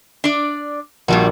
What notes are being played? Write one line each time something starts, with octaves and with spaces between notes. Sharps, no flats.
D4 D5
A#1 G2 G3 F#4